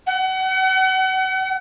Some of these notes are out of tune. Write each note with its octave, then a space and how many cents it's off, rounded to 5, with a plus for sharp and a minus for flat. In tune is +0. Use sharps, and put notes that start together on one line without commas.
F#5 +35